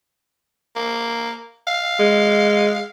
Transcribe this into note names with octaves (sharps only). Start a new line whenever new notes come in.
A#3
F5
G#3